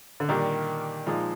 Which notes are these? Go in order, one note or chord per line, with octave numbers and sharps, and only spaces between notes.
D3
A#2 D#3 G3 D4 G4 A#4
A#2 F3 G#3 D#4